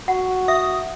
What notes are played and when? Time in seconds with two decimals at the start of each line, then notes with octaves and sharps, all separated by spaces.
0.08 F#4 F#5
0.48 E5 D#6